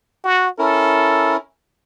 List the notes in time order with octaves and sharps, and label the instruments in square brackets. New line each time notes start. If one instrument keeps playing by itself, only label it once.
[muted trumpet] F#4
[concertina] C#4 E4 A#4 [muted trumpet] A4